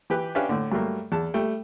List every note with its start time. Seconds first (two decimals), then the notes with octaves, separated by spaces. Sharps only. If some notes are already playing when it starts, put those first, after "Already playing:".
0.10 E3 G4 B4
0.35 C#4 D4 G4 B4 E5 F5
0.49 A2 D3
0.72 G2 F#3 A3 A#3
1.12 E2 A5
1.34 G3 A3 G5